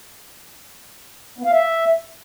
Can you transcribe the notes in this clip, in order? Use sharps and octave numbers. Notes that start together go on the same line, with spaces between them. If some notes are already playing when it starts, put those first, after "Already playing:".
B3
F5
E5